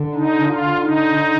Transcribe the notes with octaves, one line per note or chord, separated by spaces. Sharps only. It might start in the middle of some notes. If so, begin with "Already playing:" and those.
Already playing: D3
D#4
F4
D#4